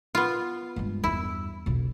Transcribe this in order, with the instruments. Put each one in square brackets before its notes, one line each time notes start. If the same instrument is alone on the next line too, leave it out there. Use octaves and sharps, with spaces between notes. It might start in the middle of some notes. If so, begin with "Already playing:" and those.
[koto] B3 F4
[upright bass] G2 G#3
[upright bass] E2 G2 [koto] E4
[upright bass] E1 B1